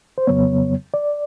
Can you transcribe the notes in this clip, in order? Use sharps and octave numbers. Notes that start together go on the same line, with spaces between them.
C5
F2 C#3 F#3 B3 C#5
D5